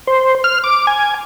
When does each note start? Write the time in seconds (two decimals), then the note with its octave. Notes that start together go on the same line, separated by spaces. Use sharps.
0.07 C5
0.44 F6
0.64 D6
0.87 G#5